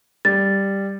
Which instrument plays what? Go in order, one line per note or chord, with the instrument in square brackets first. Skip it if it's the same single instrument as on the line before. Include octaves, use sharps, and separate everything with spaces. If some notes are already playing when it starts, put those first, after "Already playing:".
[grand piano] G3 [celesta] A6